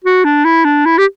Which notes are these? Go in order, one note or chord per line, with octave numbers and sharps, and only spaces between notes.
F#4
D4
E4
D4
E4
G4